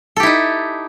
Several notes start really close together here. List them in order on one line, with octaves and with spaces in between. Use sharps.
A4 G4 E4 D#4